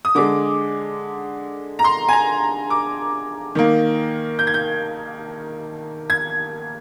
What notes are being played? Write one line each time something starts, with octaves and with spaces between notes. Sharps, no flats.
D#6
D3 G#3 D6
A#5
C6
G#5
A#5
D6
D#3 A#3
G6
G#6
G6
G#6